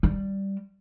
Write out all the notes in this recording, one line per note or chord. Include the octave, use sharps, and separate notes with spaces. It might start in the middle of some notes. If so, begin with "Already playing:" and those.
G3